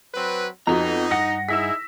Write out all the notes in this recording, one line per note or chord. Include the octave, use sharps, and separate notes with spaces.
F#3 C4 B4
F2 B3 D#4 F#4 A#5
G2 F#5 A#6
D#4 E4 G#4 E6 B6